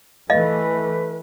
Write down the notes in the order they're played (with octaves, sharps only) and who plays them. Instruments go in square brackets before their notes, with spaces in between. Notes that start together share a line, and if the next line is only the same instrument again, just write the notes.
[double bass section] E3 A3 [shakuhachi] B4 [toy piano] D#5 F5